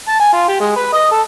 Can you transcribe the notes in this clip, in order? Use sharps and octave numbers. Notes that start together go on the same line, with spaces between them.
A5
G#5
F4
G4
G#3
B4
D#5
A4